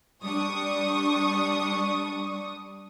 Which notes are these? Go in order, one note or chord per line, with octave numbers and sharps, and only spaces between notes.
G3 D4 C#6 D#6